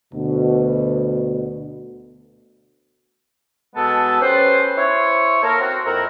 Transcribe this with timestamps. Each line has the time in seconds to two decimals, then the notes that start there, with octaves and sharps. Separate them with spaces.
0.13 D2 B2
3.75 B2 G#3 B3 A4 A5
4.20 C#4 G4 B4 C5
4.76 E4 C5 C#5
5.43 A#3 A4 A#4
5.59 C4 F#4
5.85 F2 E4 A#4